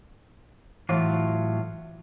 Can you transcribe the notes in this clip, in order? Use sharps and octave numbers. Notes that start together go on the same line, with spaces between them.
A2 E3 F#3 F4